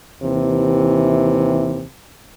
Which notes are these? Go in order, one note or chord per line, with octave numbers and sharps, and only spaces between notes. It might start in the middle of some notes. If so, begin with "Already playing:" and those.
D#2 C3 E3